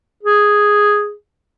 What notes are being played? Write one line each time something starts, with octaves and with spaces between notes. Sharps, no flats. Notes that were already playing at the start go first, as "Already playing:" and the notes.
G#4